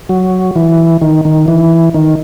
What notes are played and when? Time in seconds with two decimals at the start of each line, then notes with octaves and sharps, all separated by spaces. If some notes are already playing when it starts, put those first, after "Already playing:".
0.09 F#3
0.56 E3
1.01 D#3
1.25 D#3
1.48 E3
1.94 D#3